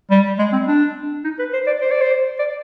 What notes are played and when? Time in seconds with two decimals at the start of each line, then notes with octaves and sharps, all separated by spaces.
0.11 G3
0.39 G#3
0.53 C4
0.68 D4
1.24 D#4
1.39 B4
1.53 C5
1.67 D5
1.81 C5
1.91 D5
2.01 C5
2.39 D5